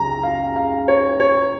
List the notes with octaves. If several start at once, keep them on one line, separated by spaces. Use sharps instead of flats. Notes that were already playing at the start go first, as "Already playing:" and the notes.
Already playing: C#2 C#3 F#3 A#5
F5
F5
C#5
C#5